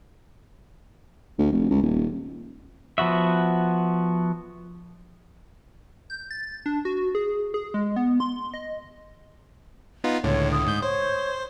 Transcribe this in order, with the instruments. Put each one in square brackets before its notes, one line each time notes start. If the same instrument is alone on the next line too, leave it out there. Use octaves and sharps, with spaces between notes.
[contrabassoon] D2
F1
C#2
D#1
[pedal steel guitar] F3 B3 F#4 E5
[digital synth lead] G6
A6
D4
F#4
G#4
G#4
G#3
B3
C6
D#5
[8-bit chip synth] B3 D#4 F4
[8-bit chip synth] C#2 A2 D3 [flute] C#5
[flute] D#6
[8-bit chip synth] G#2 G6
[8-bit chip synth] C5 [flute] C#5